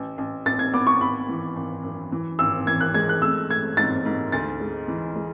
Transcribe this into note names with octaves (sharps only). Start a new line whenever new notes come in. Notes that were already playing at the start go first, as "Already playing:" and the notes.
Already playing: A1
A1
A1 A6
G#6
B3 D6
C#6
G#1 B5
E3
G#1
F#2
E3
G#1 E6
E3 G#6
F#6
G#3 G#6
F#6
A3 E6
A3 G#6
G#2 A6
G#2
D2 A6
G#3
E3
G#3